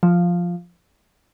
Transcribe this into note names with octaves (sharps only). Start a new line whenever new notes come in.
F3